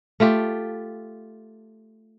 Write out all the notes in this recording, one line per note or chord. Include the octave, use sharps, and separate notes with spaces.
A3 F4 G4